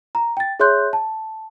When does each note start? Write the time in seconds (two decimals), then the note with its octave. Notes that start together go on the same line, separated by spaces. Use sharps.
0.15 A#5
0.37 G5 A6
0.60 G#4 C#5 E5 C6 F#6 G6
0.93 A5